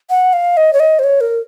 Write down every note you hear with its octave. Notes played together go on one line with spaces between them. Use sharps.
F#5
F5
D#5
C#5
D#5
C5
C#5
A#4